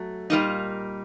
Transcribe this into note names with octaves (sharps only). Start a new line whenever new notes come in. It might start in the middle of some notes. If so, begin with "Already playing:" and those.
Already playing: F#3 A3
A#2 G3 A#3 D#4